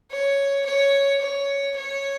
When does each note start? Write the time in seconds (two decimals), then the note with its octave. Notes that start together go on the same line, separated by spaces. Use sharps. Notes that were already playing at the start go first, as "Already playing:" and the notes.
0.11 C#5
0.65 C#5
1.21 C#5
1.76 C#5